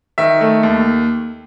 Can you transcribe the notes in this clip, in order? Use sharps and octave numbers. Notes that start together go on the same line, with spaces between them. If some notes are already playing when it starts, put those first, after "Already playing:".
D#3 E5
A3
D#2